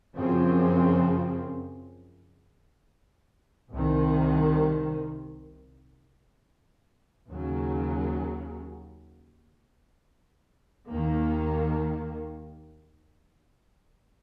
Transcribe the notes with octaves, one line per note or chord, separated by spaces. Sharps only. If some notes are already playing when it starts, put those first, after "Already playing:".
F#2 C#3 F3 C4
C2 C3 D#3
D#2 C#3 F#3
D#2 D#3 A#3